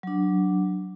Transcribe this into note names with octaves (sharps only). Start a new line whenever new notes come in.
F#3 D4